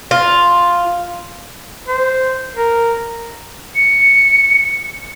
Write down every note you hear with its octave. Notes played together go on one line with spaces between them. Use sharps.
F4
C5
A#4
C#7